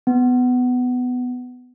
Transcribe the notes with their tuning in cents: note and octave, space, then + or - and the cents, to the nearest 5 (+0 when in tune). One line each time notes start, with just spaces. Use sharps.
B3 +15